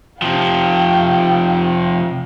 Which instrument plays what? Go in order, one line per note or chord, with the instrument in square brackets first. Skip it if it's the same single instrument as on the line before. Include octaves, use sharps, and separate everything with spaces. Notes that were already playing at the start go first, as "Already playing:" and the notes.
[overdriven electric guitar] C3 F3 [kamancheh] F5 G5